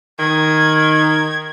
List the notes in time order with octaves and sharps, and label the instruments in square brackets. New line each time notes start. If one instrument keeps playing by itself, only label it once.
[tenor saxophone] D#3 [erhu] G#6